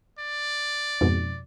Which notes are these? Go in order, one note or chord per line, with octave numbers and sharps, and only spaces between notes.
D5
F2 G#2 B2